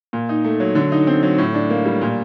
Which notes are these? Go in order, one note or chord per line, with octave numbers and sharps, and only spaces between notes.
A#2
D#4
A3
F#3
D3
D#4
C4
F#3
A2
D4
A#3
G3
A#2